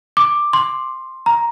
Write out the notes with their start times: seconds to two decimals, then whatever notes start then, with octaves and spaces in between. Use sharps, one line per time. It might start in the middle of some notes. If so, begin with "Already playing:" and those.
0.17 D6
0.53 C6
1.26 A#5